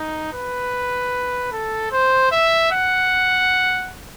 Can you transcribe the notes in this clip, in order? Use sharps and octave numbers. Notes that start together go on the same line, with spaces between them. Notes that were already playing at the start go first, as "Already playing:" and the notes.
Already playing: D#4
B4
A4
C5
E5
F#5